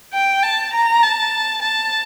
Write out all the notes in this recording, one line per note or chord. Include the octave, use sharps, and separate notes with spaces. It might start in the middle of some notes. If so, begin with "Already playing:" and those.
G5
A5
A#5
A5
A5